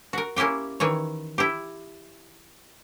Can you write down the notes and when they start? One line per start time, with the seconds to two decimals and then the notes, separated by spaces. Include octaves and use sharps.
0.13 F#4 A#4
0.36 A#3 C#4 E4 G4 G5
0.80 D#3 E3 C#5
1.38 E4 G4